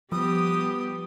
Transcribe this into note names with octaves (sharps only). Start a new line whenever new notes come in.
F3 G3 B3 G4 D#6